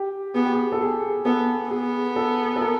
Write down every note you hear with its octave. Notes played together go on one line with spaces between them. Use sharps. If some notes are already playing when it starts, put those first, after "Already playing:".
Already playing: G4
B3 G#4
G4
G#4
A4
G#4
B3 A4
B3 G#4
A4
A4
A#4